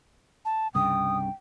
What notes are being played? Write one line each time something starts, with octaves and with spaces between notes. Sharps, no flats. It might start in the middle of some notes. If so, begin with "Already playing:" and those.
A5
C2 G2 C#3 G5 D#6